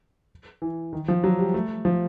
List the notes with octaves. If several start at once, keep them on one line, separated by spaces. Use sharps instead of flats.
E3
D#3
F3
F#3
G3
A3
F3